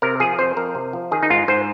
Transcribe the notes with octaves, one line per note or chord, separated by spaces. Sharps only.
C3 A#4
F3 G#4
F2 C5
F2 A#4
C3
F3
D#3 G#4
D#4
G#2 F4
G#2 C5